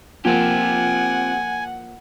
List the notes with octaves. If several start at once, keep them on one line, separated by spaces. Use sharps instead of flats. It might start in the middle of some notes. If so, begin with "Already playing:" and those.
F3 A#3 C4 F4 G4 F#5 G#5